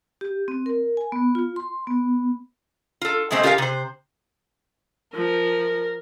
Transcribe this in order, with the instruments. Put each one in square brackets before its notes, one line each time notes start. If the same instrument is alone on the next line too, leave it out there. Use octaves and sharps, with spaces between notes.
[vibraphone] G4
C4
A#4
G#5
B3
F4
C6
B3
[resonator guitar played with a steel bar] F4 A4
B2 G#3 A3 C4 C5
F4 G4 G#4 A#4 E5 F5
C3 C5
[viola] F3 [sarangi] A#4